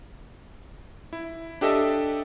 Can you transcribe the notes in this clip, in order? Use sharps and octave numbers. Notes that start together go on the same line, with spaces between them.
E4
D4 G4 A4 D#5 E5 A5